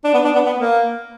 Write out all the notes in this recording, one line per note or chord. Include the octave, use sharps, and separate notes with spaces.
D4
B3
D4
B3
B3
A#3